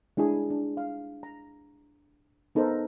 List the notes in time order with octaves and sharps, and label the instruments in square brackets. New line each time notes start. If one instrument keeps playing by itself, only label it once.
[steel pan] G#3 D4 E4 G#4
D4
F5
A#5
B3 D#4 A4 A#4 C5